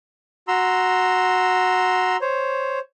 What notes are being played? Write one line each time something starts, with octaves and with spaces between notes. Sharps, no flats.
F#4 A#5 C6 E6
C5 C#5